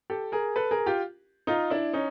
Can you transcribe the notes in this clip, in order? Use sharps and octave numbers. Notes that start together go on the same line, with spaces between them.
G4 A4
G#4 A#4
A4 B4
G#4 A#4
F4 G4
D#4 F4
D4 E4
C#4 D#4